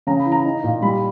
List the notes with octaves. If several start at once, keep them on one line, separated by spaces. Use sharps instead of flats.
C#3 A#5
B5
E3
A#5
D#4
A#2
G3 B5